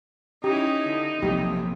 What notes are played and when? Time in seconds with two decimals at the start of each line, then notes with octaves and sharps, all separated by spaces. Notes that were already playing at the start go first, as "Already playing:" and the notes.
0.44 C#4 D#4 E4 G4
0.88 D3
1.22 A#1 C3 F#3 A3 G4